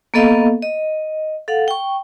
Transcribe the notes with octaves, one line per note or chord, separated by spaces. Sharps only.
A#3 B3 A4 D#5 F5
D#5
A4 F5 F#5
G5 C#6